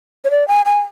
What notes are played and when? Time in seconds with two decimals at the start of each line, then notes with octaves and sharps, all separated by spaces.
0.25 C#5
0.31 D5
0.48 G#5
0.66 G#5